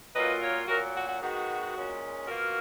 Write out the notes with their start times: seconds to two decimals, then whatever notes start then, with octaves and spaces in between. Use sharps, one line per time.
0.15 A#2 F#3 A#3 F4 B4 D#5
0.42 A#4 C#5
0.68 A#2 F#3 A#3 F#4 A#4
0.95 F#4
1.08 F#4
1.21 D#3 G#3 B3 F#4
1.74 A#2 G#3 C#4
2.28 B2 A#3 F4 F#4 A#4